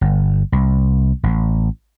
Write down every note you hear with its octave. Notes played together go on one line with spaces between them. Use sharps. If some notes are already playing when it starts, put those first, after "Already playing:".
G1
C2
A1